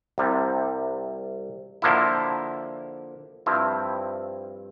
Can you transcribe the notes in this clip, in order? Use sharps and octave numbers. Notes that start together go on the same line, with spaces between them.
C2 C3 G3
D3 F3 A#3 E4
G2 F3 C4 E4